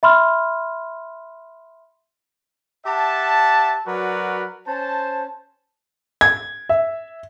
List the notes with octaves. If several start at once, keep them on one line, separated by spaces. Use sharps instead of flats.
E5 B5 C6 F6
G4 E5 F#5 A5
F#3 F#4 A#4 B4 D5
C#4 C5 A5
G#6
E5